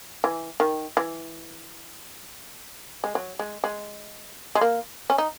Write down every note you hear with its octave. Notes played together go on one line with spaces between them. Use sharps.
E3
D#3
E3
G#3
F#3
G#3
G#3
G#3
A#3
C#4
D#4